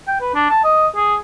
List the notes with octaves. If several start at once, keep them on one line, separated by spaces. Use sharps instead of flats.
G5
B4
D4
A5
D#5
G#4